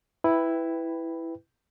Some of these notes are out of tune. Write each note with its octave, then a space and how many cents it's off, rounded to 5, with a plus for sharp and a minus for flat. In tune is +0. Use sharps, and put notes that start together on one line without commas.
E4 +0 B4 +10 G5 +0